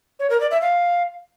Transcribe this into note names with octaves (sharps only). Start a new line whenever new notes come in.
C#5
A#4
D5
E5
F5